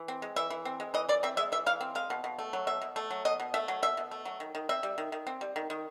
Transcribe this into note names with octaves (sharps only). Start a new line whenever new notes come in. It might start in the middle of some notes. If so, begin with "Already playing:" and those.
Already playing: E3
C4
G#3
E3 E5
E3
C4
G#3
E3 D#5
E3 D5
C4 E5
G#3 E5
E3 E5
E3 F5
C4
G#3 F5
B2
B2
A3
F#3
B2 E5
B2
A3
F#3
B2 D#5
B2
A3 E5
F#3
B2 E5
B2
A3
F#3
D#3
D#3
C4 E5
G3
D#3
D#3
C4
G3
D#3
D#3